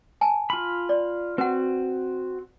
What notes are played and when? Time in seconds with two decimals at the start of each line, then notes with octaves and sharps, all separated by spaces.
0.21 G#5 A5
0.50 F4 B5
0.89 D5
1.38 C4 F#4 B4 F#5